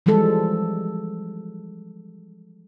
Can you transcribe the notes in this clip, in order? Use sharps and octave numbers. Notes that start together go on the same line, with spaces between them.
E3 F3 G3 G#3 A4